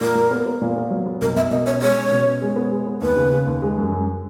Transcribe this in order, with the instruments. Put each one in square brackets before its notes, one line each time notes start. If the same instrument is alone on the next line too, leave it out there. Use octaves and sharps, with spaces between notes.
[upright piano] A#2 [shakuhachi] A#4
[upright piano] A#2
B3
B3
A#2
B3
F#3
B3
[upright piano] B1 [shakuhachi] A#4
[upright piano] B1 [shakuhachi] E5
[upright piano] B2 [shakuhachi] D#5
[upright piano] C#4 [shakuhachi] C#5
[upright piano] G#3 [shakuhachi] C#5
[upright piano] C#4
B2
C#4
G#3
B3
G#3
B3
[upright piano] D#2 [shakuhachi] B4
[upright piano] C#3
C#3
D#2
G#3
F#2
F#2